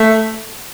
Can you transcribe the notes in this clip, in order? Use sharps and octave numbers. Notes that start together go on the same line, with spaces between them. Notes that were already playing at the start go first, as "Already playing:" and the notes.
Already playing: A3